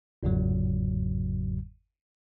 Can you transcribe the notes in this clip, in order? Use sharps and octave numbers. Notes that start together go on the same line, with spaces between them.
G1 E2 G#2 C#3 F#3